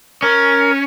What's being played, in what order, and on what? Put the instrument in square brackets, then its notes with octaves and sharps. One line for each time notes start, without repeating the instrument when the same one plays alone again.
[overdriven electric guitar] C#4 [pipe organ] A#4